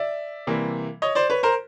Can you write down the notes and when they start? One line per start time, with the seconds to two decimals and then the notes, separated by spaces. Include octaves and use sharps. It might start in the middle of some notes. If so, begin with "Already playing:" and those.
Already playing: D5 E5
0.47 C3 E3 G3 A#3
1.02 C#5 D#5
1.15 C5 D5
1.30 B4 C#5
1.43 A#4 C5